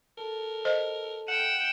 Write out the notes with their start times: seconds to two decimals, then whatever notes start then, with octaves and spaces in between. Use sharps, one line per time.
0.17 A4 A#4 A5
0.65 C5 D#5
1.28 F#5 G5 E7